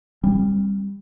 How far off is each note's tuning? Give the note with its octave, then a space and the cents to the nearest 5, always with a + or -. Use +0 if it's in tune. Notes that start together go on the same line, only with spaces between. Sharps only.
G3 +20 C4 +25